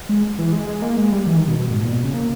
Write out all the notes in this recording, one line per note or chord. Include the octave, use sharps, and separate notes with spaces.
G#3
E3
G#3
G#3
A#3
G#3
G3
E3
D#3
B2
B2
G#2
A#2
B2
C#3
A#3